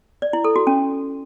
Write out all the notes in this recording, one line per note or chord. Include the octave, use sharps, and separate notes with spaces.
D5
E4
A4
F#4
C#4